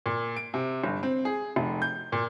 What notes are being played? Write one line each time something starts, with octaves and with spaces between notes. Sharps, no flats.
A#2
D7
C3
G1
C4
G#4
F1
G6
A#2